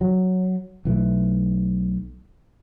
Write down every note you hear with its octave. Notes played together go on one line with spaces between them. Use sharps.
F#3
B1 E3 A3